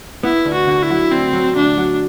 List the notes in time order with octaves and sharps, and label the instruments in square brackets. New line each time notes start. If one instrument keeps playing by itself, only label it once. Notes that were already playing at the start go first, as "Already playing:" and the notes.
[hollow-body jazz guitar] B3 [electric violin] E4
[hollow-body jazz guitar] D2
[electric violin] F#4
[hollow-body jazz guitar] D3
[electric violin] E4
[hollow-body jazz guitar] F#3
[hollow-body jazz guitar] D2 [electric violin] C4
[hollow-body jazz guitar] F#3
[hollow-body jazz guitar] D2 [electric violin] D4
[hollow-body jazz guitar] F#3